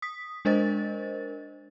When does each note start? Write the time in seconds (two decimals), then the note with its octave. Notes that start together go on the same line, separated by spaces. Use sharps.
0.02 D#6 B6
0.45 G#3 D4 A#4 C5 D#5 A6